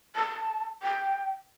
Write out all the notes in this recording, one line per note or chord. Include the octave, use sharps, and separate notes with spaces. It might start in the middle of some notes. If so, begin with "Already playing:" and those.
A5
G5